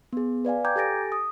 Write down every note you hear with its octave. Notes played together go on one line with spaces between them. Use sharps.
B3 G#4
B4 D5 F5 G#5
G5 A#5 D6 G6 G#6
G4 A4 G#5 A6 A#6 D7
D#6